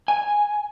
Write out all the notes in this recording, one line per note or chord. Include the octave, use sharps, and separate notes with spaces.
G#5